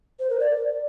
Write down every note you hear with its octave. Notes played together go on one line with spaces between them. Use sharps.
C5
A#4
D5